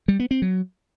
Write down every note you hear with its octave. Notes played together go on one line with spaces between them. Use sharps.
G3
B3
C4
F#3